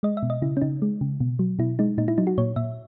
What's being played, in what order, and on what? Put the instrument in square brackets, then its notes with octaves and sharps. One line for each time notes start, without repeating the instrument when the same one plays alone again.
[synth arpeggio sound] G#3 D#5
E5
B2
D#5
C#3 E4
C#4
C#3 D#4
G#3
C#3
B2
F#3
B2 E4
G#3 D#4
A#2 D#4
E4
F#3 D#4
F#4
A#2 C#5
A#2 E5